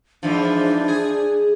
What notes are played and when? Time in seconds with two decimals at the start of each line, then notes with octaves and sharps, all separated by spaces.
0.23 G#2 E3 F3 D4
0.88 G#4